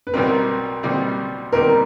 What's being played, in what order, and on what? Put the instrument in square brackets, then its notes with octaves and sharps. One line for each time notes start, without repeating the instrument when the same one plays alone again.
[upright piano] B4
[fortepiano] B1 B2 G3 C4 [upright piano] A#4
[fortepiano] B1 B2 G3 C4
[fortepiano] B1 B2 G3 C4 [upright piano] A#4